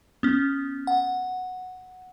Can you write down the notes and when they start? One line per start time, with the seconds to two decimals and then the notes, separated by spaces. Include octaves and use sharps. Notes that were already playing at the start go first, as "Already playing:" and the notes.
0.23 B3 C#4
0.87 F#5